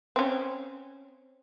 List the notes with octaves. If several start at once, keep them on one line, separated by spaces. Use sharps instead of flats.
C4 C#4